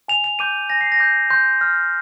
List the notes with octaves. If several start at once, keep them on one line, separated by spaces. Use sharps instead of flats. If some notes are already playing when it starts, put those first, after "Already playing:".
G#5 F7
F7
D6 G6 D#7
G#5 A#6
C7
A#6
D6 G6
C6 G6
F6